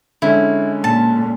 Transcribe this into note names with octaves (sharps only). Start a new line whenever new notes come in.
D3 G#3 C#4 E4
A#2 A5